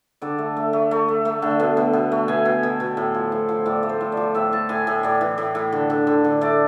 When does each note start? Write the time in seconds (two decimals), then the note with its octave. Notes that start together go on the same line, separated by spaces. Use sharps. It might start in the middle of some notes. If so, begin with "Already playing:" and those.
0.22 D3 D5
0.38 A3
0.57 A3
0.73 A3
0.91 A3
1.08 A3
1.25 A3
1.42 D3
1.60 B2
1.77 B2
1.93 B2
2.12 A3
2.28 B2 G#5
2.45 B2
2.63 B2
2.80 B2
2.97 A2
3.14 F3
3.32 A2
3.49 F3
3.66 A2 D5
3.83 A3
3.89 C5
4.01 A2
4.12 D5
4.17 F3
4.35 A2 E5
4.52 A2 A5
4.69 A2 G#5
4.87 A2 G#5
5.03 A2 D5
5.21 E3
5.38 A2
5.55 A2
5.72 D3
5.90 D3
6.07 D3
6.25 D3
6.41 A3 D5